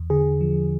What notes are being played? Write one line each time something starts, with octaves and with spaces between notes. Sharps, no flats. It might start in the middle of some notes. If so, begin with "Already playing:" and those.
Already playing: E2
D3 G#4
F3